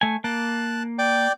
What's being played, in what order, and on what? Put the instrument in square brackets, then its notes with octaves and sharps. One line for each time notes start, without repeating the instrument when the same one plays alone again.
[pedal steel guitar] A3 G#5
[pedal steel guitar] A#3 [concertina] A5 F#6
[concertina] D5 G5 D6